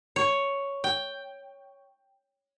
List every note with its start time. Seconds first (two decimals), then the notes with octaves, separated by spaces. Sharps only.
0.16 C#5
0.84 G5